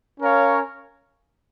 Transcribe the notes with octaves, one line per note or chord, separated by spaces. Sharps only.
C#4 A#4 C#5 F5